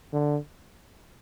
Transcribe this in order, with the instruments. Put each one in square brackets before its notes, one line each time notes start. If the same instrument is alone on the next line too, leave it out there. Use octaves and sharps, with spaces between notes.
[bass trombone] D3